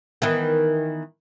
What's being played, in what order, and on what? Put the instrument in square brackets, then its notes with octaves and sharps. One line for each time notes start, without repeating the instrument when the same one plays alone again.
[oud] D#3 E3 B3